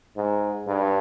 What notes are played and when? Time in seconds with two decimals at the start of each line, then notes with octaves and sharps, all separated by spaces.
0.17 G#2
0.68 G2